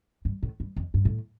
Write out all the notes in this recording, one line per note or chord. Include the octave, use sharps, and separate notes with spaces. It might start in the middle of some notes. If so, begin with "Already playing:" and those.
G2
A2
G2
F2
G2
A2